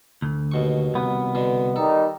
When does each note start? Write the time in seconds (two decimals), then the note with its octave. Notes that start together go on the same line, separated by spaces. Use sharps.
0.22 D2
0.51 D#2 B2 C#6
0.94 C2 B3
1.35 B2 D3
1.76 D#3 G3 D#4 A4